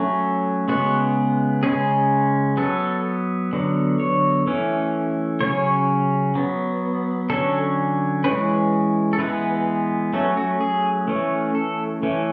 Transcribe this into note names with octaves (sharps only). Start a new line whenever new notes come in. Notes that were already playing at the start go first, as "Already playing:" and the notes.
Already playing: F#3 A3 C#4
C#3 G#3 B3 F#4
C#3 G#3 C#4 G#4
F#3 B3 A4
D3 F#3 B3
C#5
E3 A3 C#4
C#3 F#3 C#4 C#5
F#3 B3
D3 F#3 C#4 A4
E3 G#3 C#4 B4
A4
E3 G#3 B3 B4
F#3 A3 C#4 A4
F#4
G#4
E3 A3 C#4
A4
E3 A3 C#4